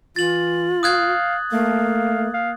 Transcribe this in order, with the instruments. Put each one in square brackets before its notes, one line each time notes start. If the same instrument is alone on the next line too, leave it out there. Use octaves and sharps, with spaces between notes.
[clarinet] E3 [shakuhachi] F4 [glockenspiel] A6 F#7
[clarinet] F5 [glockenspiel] D#6 F#6 G#6
[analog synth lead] A3 [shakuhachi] A#3 [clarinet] F5
[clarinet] F5